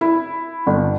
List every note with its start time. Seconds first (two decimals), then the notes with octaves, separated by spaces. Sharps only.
0.01 E4
0.67 G1